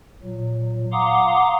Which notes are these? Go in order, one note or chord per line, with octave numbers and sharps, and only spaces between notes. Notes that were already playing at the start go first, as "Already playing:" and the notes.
A#2 F#3
F5 F#5 A#5 C6 D6 D#6